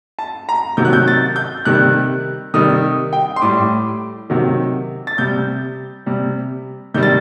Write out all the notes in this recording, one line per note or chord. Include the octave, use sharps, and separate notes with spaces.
A5
A#5
C3 D#3 F#3 G6
F#6
G6
A6
G6
C3 D#3 G3 F#6
C3 D#3 G3 D#6
G5
C6
A2 G3 D6
C3 D#3 F#3
A6
C3 G3 G6
C3 G3
C3 D#3 G3 G6
A6